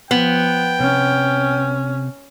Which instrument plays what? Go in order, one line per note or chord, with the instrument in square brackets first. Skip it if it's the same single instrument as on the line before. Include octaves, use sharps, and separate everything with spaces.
[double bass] F3 [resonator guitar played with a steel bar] B3 [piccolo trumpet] G5
[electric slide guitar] C3 [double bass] C#4